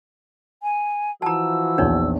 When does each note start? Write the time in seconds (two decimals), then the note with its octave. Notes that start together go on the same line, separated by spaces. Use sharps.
0.63 G#5
1.22 E3 F3 F#4 A5 A#5 E6
1.78 A#1 E2 D4 D#4 C#5